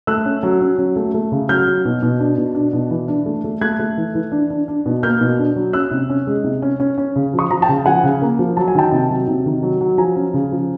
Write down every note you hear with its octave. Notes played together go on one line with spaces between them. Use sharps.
A3 E6 F#6
C#4
F#3
C#4
F#3
A3
A3
C#3
F#3 F6 G6
F#3
B2
B2
D4
B2
D4
B2
E3
D4
A3
A3
A3 F#6 G#6
A3
E3
E3
D4
D4
D4
B2
A#3 F6 G6
B2
D4
F#3
C#4 E6 F#6
C3
C#4
G#3
C3
C#4
C#4
C#4
C#3
F3
C#6 D#6
F3 A#5
G5 A5
C#3
F3 F#5 G#5
C#3
A#3
F3
F#3 A5
G#5
D#3 G5 A5
C3
F#3
C3
D#3
F#3
F#3
F3 G#5 A#5
C#4
C#3
F3